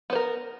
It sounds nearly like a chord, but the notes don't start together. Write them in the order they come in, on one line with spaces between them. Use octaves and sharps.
B3 C5 A#4